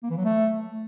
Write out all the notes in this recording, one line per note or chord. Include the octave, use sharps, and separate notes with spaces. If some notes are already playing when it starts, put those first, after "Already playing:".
A#3
E3
F#3
A3